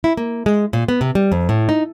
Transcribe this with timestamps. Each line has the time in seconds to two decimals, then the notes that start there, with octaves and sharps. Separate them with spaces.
0.04 E4
0.17 A#3
0.46 G#3
0.73 A#2
0.88 B3
1.01 C3
1.15 G3
1.32 F2
1.49 A2
1.69 D#4